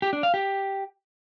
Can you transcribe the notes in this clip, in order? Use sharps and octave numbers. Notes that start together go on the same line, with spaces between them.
G4
D4
F5
G4